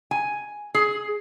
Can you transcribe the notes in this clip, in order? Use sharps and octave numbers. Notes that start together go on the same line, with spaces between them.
G#5
G#4